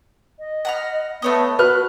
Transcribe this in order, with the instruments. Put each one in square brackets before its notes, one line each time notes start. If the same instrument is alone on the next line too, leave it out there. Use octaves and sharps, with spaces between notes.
[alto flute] D#5
[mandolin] F#5 B5 F6
[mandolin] A3 C#5 D#5 [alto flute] B3
[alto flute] F#4 [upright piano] B4 F6 [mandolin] F#6